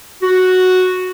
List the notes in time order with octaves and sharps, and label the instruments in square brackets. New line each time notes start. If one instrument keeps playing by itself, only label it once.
[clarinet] F#4